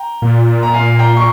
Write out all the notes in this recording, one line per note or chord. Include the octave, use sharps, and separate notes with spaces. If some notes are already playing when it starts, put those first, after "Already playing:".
Already playing: G5 A#5
A#2
A#5
F5 G#5
G5 A#5
C#6